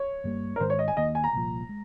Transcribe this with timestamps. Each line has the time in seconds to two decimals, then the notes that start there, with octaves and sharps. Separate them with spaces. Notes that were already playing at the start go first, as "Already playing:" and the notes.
Already playing: C#5
0.24 G2 G3 A#3
0.56 A#4
0.60 G#2 D#3 G#3 C#4 C5
0.70 C#5
0.79 D#5
0.88 G#5
0.97 D#2 D#3 A#3 D#5
1.15 G#5
1.24 A#5
1.33 C2 A#2 F3
1.69 G#3